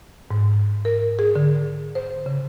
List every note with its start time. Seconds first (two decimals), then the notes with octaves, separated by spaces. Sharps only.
0.31 G#2
0.85 A#4
1.19 G#4
1.36 D3
1.95 C5
2.26 C#3